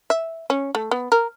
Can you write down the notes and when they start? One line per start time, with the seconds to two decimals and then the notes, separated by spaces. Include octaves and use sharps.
0.10 E5
0.50 C#4
0.75 A3
0.91 B3
1.12 A#4